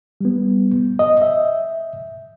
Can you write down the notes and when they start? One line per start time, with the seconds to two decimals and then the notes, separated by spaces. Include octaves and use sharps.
0.21 G3 B3
0.99 D#5
1.22 E5